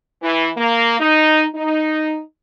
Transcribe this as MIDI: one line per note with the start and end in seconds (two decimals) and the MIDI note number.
0.23 0.50 52
0.57 0.97 58
1.00 1.45 63
1.55 2.20 63